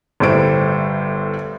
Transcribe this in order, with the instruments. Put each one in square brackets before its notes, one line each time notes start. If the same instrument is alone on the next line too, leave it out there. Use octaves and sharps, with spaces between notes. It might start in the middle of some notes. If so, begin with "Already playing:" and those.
[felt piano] G1 A2 G3 C5 D7